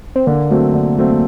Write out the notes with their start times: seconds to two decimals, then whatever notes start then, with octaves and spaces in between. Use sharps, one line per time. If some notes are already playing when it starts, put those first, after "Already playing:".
0.16 C4
0.27 D3 A#3
0.51 F#3 A3 C4
0.74 D3
0.98 F#3 A3 C4